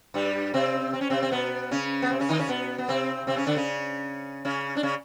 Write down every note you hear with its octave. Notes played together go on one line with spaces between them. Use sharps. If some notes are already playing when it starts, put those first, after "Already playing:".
G2 G3
C3 C4
C4
C#4
C3 C4
C4
B2 B3
C#3 C#4
B3
C3 C4
C#3 C#4
D#3 D#4
C#3 C#4
B2 B3
B3
C3 C4
C3 C4
C#3 C#4
D3 D4
C#3 C#4
C#3 C#4
D4
C#3 C#4